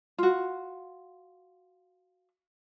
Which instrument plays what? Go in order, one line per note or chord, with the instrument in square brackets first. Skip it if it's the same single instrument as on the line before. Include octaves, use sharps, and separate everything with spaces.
[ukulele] F4 F#4